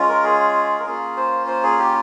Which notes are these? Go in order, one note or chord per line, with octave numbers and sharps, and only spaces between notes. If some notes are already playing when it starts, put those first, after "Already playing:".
Already playing: G#3 C#4 F4
A#4
G#4
A#4
A#3 C#4 F4 G#4
C5
C5
G#4
G4